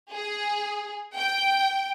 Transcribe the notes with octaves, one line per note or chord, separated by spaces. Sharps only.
G#4
G5